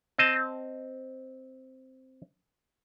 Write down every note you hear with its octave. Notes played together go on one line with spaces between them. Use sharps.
C4 D#5 A5